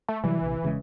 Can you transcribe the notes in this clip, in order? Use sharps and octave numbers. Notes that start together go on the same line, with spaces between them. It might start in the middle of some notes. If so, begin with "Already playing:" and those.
A3
C3 E3 F#3 G3
A#1 C3
E1 C#3 G#3